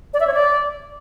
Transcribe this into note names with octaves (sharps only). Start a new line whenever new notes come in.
D5
E5
C#5
D5